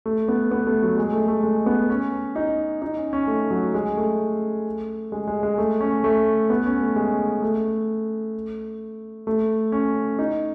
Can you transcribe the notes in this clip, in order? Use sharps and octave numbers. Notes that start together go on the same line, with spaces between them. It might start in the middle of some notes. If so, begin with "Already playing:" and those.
A3
B3
B3
A3
F#3
G#3
A3
A3
G#3
B3
C#4
D#4
D#4
C#4
C#4
A3
F#3
G#3
A3
G#3
G#3
G#3
A3
C#4
A3
B3
C#4
A3
G#3
A3
A3
C#4
D#4